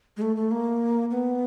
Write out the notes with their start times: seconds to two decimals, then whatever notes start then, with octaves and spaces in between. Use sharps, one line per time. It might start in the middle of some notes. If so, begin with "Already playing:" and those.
0.17 G#3
0.22 A3
0.36 A3
0.51 A#3
1.11 B3